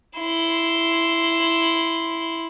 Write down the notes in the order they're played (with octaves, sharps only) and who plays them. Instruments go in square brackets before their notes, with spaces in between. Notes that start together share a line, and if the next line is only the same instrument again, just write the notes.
[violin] E4 C6